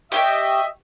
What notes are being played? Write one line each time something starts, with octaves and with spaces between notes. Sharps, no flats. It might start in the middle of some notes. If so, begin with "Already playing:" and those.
G4 C#5 D#5 E5 G5